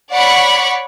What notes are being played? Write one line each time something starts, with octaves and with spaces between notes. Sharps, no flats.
C#5 D5 F#5 B5 C#6